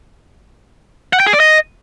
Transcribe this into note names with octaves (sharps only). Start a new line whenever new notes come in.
F#5
G5
G#4
D5
D#5